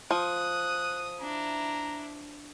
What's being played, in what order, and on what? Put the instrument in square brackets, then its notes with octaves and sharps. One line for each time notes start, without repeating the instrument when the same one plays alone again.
[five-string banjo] F3 [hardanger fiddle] D#6 [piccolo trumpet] F#6
[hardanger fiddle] D4 E4 [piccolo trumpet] A#5